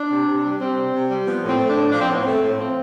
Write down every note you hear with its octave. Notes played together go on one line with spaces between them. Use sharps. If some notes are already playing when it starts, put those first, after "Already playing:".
Already playing: D4
C3
C3
G3
G3 C4
C3
C3
G3
F3 B3
A2
C4
A3
A2 D4
F3 D4
C4
A2 B3
A3 C4
A2
F3 C4